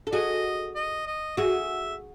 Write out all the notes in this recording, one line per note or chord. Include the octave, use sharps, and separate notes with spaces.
A4
F#4 G#4 D#5
D#5
D#5
F#4 G#4 E5